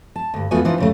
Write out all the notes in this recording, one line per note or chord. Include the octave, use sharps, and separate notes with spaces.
A5
D2 G2
E2 A3 B3 F4 F#4 G#5
E3 D4 D#4 F4 B4 C5
D#2 C#3 A3